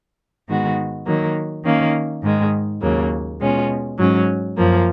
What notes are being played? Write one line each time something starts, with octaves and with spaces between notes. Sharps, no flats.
G#2 D#3 G#3 B3 F#4
D#3 F#3 A#3
D#3 A#3 C#4
G#2 D#3 G#3
D#2 C#3 F#3 A#3
B2 G#3 C#4 F4
G#2 F#3 C#4
F#2 F3 A#3